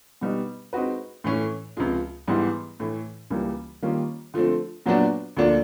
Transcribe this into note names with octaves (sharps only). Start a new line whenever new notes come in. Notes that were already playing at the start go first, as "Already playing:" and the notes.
B2 G3 B3 D#4
G#3 C4 D#4 F#4 B4
A2 E3 A3 C#4
C#2 C3 F3 G#3
G#2 E3 G3 B3 E4
A2 E3 A3
C#2 C#3 E3 G3 A#3
D#3 G3 A#3 C#4 F4
D3 F3 A3 C4
A#2 F#3 B3 D4 F#4
D2 D3 F3 A#3 D4